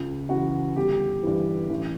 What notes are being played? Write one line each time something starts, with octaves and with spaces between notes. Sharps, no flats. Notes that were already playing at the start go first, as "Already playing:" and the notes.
Already playing: C#2
C#3 E3 F#4
G1 G4
G2 E3
A1